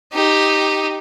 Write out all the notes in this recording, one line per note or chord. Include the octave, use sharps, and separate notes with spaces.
D#4 G4